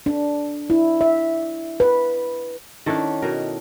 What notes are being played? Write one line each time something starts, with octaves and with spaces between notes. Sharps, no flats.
D4
E4
E5
B4
D#3 C#4 D4 E4 A4
B2 A#4